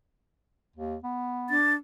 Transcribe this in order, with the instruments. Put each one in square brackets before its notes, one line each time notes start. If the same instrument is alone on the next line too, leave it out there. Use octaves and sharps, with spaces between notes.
[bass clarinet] D#2
B3
[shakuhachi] D4 [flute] A6